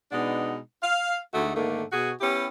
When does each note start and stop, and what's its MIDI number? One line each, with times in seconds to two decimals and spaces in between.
0.12 0.57 47
0.12 0.57 56
0.12 0.57 59
0.12 0.57 62
0.12 0.57 63
0.12 0.57 78
0.82 1.18 77
1.34 1.55 38
1.34 1.55 50
1.34 1.55 56
1.34 1.55 57
1.34 1.55 63
1.34 1.55 66
1.55 1.83 44
1.55 1.83 50
1.55 1.83 51
1.55 1.83 57
1.55 1.83 58
1.92 2.12 47
1.92 2.12 66
1.92 2.12 68
2.21 2.47 59
2.21 2.47 61
2.21 2.47 64
2.21 2.47 67